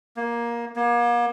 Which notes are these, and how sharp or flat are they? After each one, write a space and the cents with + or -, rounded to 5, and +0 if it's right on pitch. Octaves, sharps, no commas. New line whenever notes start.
A#3 +15
A#3 +40